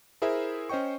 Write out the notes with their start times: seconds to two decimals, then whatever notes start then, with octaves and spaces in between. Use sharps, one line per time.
0.22 E4 G#4 A#4 C5 E5
0.69 C#4 C5 D#5 G5 C#6